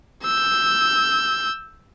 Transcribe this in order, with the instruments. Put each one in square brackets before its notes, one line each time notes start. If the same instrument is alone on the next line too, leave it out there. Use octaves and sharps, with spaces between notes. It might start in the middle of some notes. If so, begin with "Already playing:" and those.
[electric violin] E6 G6